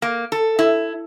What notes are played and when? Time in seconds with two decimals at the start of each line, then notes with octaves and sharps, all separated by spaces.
0.02 A#3
0.32 A4
0.59 E4